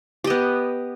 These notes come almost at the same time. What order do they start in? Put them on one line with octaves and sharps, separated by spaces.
G4 D#5 B3